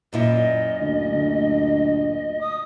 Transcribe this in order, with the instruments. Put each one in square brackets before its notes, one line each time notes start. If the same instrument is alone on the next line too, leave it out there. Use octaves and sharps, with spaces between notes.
[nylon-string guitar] F#2 A#2 E4 [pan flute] D#5
[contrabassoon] D2
D2
[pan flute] D#6